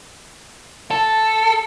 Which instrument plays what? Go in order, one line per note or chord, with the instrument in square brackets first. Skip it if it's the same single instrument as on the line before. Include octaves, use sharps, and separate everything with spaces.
[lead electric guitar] A4